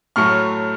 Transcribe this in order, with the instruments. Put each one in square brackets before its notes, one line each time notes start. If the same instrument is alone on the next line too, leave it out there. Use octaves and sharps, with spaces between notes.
[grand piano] A2 F#3 A3 C#6 F6